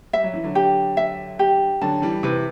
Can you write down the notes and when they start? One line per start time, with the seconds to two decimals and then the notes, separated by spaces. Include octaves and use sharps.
0.13 G3 E5
0.24 F#3
0.34 E3
0.44 D3 F#3
0.55 G4
0.97 E5
1.39 G4
1.81 D3 F#3 A5
2.02 E3 G3
2.23 C3 E3 B4